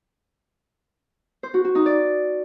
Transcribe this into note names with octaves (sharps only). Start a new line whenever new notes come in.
C5
F#4
F#4
D#4
D5